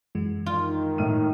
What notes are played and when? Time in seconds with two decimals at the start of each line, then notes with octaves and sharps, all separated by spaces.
0.15 F#2 E3 G#3
0.46 D#3 F4
0.98 A2 F6 D#7